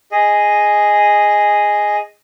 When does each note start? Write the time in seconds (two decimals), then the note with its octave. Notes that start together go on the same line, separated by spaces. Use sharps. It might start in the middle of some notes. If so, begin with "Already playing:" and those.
0.12 G#4 D#5